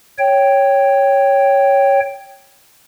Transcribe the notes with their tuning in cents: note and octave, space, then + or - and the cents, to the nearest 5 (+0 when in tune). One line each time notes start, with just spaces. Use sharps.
C#5 +0 G5 +0